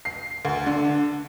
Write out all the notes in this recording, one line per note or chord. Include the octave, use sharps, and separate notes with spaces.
C7
D2
D3